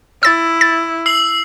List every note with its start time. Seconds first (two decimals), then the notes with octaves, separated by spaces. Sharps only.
0.23 E4 E6 A6
0.61 A6
1.06 E6 C7 F#7